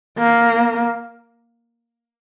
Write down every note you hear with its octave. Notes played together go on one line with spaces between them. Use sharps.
A#3